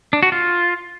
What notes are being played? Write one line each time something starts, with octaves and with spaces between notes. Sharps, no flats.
D4
F#4
F4